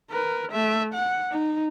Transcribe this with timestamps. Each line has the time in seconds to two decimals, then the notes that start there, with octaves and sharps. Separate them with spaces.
0.11 A#4 B4
0.52 A3 E5
0.94 F#5
1.31 D#4